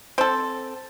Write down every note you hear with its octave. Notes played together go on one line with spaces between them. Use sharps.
C4 A4